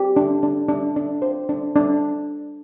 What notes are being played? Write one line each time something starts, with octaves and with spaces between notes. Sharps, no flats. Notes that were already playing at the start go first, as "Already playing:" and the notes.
Already playing: G4
D4
D4
D4
D4
C5
D4
D4